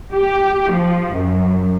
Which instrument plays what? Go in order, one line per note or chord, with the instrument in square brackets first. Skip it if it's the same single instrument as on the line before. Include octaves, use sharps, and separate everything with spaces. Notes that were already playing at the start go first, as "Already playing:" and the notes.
[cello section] G4
F3
F#2